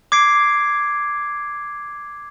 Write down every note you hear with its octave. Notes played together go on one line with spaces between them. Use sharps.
D6 G#6 C7 D7